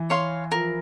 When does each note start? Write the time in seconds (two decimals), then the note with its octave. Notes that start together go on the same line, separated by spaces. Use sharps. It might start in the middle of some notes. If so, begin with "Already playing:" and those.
Already playing: E3
0.10 C#5 F5 C6
0.52 F3 A#4